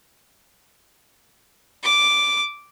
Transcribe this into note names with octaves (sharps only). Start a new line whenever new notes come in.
D6